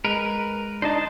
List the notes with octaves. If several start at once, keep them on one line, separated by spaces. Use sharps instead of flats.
G#3 A#4 B4
D4 D#4 C5 D#5 A5